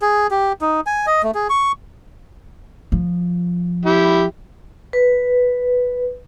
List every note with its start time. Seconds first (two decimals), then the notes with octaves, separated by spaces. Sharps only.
0.02 G#4
0.31 G4
0.61 D#4
0.86 G#5
1.07 D#5
1.23 A3
1.34 G#4
1.50 C#6
2.92 F3
3.85 E4 G4
4.93 B4